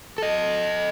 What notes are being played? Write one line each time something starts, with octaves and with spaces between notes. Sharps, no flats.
A4 D#5